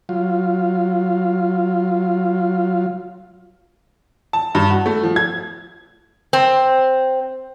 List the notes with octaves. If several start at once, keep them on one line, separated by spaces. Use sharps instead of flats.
F#3 F4
A5
G2
F#4
A3
F3
G#6
C4